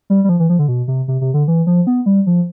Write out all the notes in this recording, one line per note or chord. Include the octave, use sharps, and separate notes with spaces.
G3
G3
F3
E3
F3
D3
B2
C3
C3
C3
D3
E3
F3
B3
G3
F3